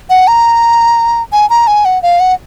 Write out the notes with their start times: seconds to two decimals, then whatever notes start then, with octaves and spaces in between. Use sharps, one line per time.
0.10 F#5
0.28 A#5
1.32 G#5
1.50 A#5
1.67 G#5
1.85 F#5
2.03 F5
2.20 F#5